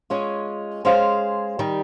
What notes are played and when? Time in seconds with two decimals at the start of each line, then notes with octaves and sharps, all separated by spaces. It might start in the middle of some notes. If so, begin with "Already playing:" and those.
0.10 G#3 C#4 F4
0.85 G#3 C#4 G#4 C5 F5
1.59 D#3 G3